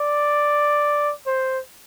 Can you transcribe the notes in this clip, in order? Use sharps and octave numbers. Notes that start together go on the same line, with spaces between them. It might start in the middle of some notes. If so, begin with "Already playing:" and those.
Already playing: D5
C5